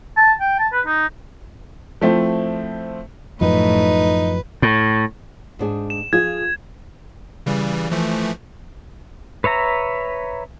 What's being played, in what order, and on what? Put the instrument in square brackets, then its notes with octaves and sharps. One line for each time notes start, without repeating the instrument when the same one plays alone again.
[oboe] A5
G5
A5
B4
D#4
[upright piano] F3 A3 C4 E4
[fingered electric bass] F#2 F3 [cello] A2 [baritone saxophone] D#4 [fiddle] B4
[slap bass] A2
[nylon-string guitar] G#2 D4 G#4
[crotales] E7
[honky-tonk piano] F3 F4 [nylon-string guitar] G#4 [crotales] G#6
[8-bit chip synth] C#3 E3 G3
E3 F3 A3
[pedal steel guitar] B4 C#5 E5 A#5